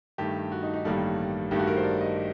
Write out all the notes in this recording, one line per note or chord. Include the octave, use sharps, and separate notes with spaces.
G2 D#3 A3 G4
F#4
D#4
D#4
A1 G2 D#3 G3 A#3 A4
G2 D#3 A3 G4
F#4
A#4
C5
D5
D#5